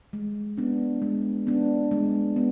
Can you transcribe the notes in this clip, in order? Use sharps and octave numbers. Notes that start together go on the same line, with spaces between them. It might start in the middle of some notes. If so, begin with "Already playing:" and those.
G#3
B3 D4
G#3
B3 D4
G#3
B3